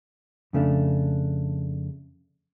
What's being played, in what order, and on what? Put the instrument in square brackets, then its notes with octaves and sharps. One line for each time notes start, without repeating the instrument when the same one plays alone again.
[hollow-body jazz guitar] F2 C#3 A3 D4